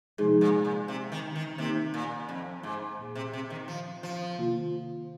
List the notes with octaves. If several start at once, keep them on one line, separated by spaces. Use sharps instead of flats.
G#2 C3 F3 G#3 D#4 G#4
A#2
A#2
C3
D#3
D#3
C3 D#3 A#3 D#4 A#4
A#2
F2
G#2
A#2 A#3 G#4
C3
C3
D#3
F3
F3
C3 D#3 A#3 F4